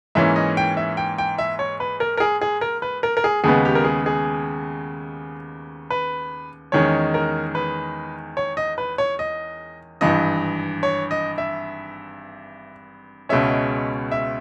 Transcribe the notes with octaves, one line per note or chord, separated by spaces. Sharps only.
G#2 E3 A#3 C#4 E5
D#5
G5
E5
G5
G5
E5
C#5
B4
A#4
A#4
G#4
G#4
A#4
B4
A#4
A#4
G#4
D#2 C#3 G#3 B3 G#4
G4
A#4
G#4
G#4
B4
E2 D#3 G#3 C#4 C#5
A#4
B4
C#5
D#5
B4
C#5
D#5
G#1 G2 E3 D#5
C#5
D#5
E5
C#2 B2 G#3 C#4 E5
E5